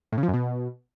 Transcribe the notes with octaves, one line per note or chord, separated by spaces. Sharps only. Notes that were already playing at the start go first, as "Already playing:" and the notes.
A2
C#3
F3
F#2
B2